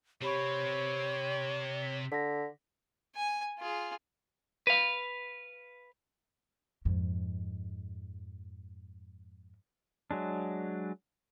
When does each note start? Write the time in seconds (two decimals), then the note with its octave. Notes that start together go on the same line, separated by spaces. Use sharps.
0.22 C3 C4 G4 C#5 B5 C#6
1.82 B6
2.12 D3 A#6 B6
3.15 G#5
3.59 F4 G#4
4.67 B4 F5
6.85 F2 G#2
10.11 F#3 G#3 D4